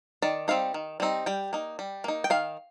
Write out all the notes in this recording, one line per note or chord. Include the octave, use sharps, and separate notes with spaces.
D#3 D5
G3 C4 D#4 F5
D#3
G3 C4 D#4
G3 G5
A#3 D#4
G3
A#3 D#4
G5
D#3 F5